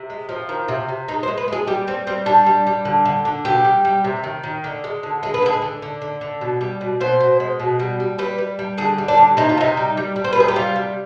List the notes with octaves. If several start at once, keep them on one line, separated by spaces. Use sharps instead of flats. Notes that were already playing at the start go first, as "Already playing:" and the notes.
Already playing: C3
G#3
F3
D#3
C3
C3
G#3 D#4
C5
G#3
B4
G#3 G#4
G3 G4
G3 C4
G3 C4
G3 D4
G3
G3
D3
D3
D3
B2 G4
G3
G3
C3
D#3
D#3
D3
G#3
D3
G#3 G#4
B4
D3 G#4
D3
D3
D3
D3
B2
G3
B2
B2 C5
B2
G#3
B2
G3
G3
G3 B4
G3
G3
D3 G#4
G3
D4
D3
C3 D#4
F4
C3 D#4
G3
G3
G3
C5
B4
C3 G#4
G4
G3 F4
G3